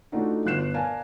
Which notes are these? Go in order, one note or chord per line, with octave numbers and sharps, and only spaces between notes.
A3 D4 D#4 F4 F#4
G1 F4 F#6 C7 E7
A#4 D5 F5 G#5 A5